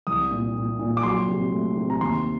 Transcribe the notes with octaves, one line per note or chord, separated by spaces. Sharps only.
C2 D#6
A#2
A#2
A#2
D6
F#3 C6
C3
A3
C3
A#5
D#2 C6